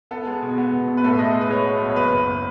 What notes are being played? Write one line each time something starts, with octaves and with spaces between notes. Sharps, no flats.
B3 A4
G#3
B2
B3
B2
B2
B4
A2 A4
E5
G#3 D#5
G#3
B4
G#3 C#5
B3
B1
C#5
F#1 B4
F#1